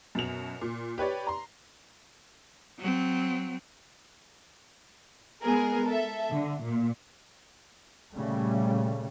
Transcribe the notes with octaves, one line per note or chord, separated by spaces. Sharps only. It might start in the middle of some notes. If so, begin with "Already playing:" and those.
F#2 B2 F7
A#2
G4 B4 C#5 D5
A#5 C6
F#3 C4
G#3 B3 G#4 A#4
A4 E5
D3
A#2
A#2 C#3 G3 A3